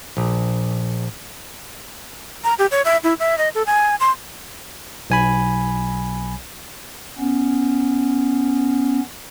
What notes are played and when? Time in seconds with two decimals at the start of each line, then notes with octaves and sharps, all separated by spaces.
0.17 A#1
2.44 A#5
2.59 G4
2.71 C#5
2.85 E5
3.04 E4
3.20 E5
3.38 D#5
3.55 A4
3.67 G#5
4.00 C6
5.10 B1 G#5 B5
7.19 B3 C#4